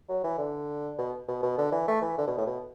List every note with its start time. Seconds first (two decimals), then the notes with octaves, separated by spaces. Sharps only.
0.09 F#3
0.24 E3
0.38 D3
0.98 B2
1.28 B2
1.43 B2
1.58 D3
1.72 E3
1.88 A3
2.02 E3
2.18 D3
2.27 B2
2.38 A2
2.47 B2